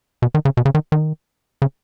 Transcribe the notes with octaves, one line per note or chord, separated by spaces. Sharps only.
B2
D#3
C#3
B2
C#3
D#3
D#3
C#3